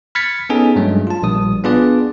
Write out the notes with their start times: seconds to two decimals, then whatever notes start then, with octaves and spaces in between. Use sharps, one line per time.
0.15 B5 F6 G#6 A6 B6 C#7
0.50 B3 C#4 D#4 G#4 A4 G#5
0.76 G2 F#3 G#3 A3
1.07 F4 A5
1.23 A#1 G3 D#6
1.64 B3 D4 F4 G#4 B4 D5